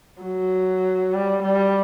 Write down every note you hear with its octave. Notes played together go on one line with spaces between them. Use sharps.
F#3
G3
G3